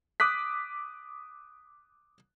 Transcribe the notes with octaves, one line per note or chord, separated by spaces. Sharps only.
D6 D#6 F#6 B6